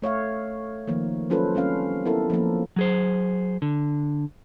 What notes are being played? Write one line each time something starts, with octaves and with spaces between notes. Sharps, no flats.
A3 C#5 E5 F5
D#3 F3 A#3
F#3 C#4 F4 A4 B4 C5
G3 C4 C#4 F5
B3 E4 A4 A#4
F3 A#3
F#3 G#4 C5
D3